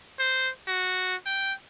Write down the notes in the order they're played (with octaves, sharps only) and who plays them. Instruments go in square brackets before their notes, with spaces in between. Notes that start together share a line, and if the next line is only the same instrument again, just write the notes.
[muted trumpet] C5
F#4
G5